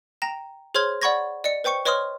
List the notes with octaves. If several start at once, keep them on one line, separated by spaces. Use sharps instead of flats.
G5 A#5 A#6 E7
G#4 C5 C#5 C6 F6 G#6
D5 F#5 B5 C#6 G#6 A#6
D5 D#5 C#7
B4 C5 G5 C#6 C#7
B4 C#5 D#5 C6 D#6 F6